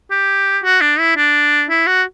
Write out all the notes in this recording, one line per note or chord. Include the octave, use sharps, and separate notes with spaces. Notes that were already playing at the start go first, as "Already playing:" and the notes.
G4
F#4
D4
E4
D4
E4
F#4